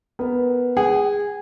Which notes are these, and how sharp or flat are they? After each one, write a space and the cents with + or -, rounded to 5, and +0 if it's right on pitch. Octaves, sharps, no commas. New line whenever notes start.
B3 +0 A#4 +0
G#4 -15 F#5 +35